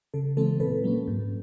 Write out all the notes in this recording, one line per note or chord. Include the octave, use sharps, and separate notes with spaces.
C#3 A4
E3 G#3 C4 A4
A#2 A4 B4
F#3 A#3 C#4
G#2